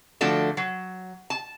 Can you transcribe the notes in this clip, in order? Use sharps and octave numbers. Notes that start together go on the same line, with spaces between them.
D3 F3 A3 D4 F#4 A4
F#3
A5